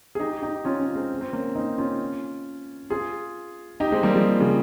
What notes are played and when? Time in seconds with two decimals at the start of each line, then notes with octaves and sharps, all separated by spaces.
0.15 G#4
0.19 D#4 G4
0.42 D#4 G4
0.65 C#4 F4
0.80 C#4 F4
0.95 G#3 C4
1.21 C4
1.32 A#3 C#4
1.55 C4 D#4
1.78 C#4 F4
2.90 F4 G#4
3.80 D#4 G4
3.92 G#3 C4
4.03 G3 A#3
4.14 F3 G#3
4.40 C#3 F3